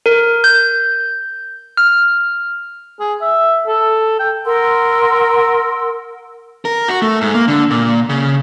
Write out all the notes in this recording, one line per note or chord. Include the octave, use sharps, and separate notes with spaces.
A#4
G6
F6
G#4
E5
A4
G5
A#4 F#5 C6 E6
A#4
F#4
A3
G#2
A#3
D3
A#2
C#3